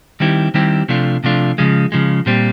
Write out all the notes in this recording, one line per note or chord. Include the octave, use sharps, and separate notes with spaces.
D#3 G3 C4 E4 G4
D#3 G3 C4 E4 G4
C3 F3 A3 D4 F4
C3 F3 A3 D4 F4
C#3 F3 G#3
C#3 F3 G#3
A#2 G3 C4